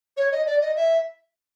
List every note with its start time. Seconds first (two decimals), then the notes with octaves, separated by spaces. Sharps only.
0.16 C#5
0.31 D#5
0.45 D5
0.60 D#5
0.75 E5